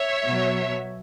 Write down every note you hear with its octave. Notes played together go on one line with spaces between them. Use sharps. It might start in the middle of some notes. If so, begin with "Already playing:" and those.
Already playing: C#5 E5
B2 F#3